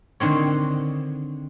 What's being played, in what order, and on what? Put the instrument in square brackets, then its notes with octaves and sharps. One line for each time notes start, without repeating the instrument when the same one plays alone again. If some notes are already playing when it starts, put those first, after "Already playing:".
[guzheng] D3 D#3 C4 C#5